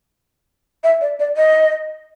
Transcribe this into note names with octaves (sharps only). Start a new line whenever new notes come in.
E5
D5
D5
D#5